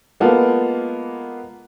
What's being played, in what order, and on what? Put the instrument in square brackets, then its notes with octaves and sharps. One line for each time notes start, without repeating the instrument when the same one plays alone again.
[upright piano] G#3 A#3 B3 F4 A4 F5